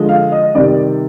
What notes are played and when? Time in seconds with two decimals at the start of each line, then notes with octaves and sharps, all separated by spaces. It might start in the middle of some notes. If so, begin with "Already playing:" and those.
Already playing: D3 F3 G#3
0.09 F5
0.32 D#5
0.55 C3 D#3 G3 D5